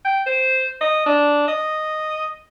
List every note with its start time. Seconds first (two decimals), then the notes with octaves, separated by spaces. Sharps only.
0.05 G5
0.26 C5
0.81 D#5
1.06 D4
1.48 D#5